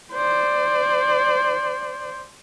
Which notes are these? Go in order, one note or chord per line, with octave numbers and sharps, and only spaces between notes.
C5 D5